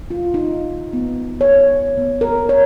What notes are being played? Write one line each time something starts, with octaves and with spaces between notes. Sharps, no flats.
F4
D#4
B3
C#5
B3
A#4
C#5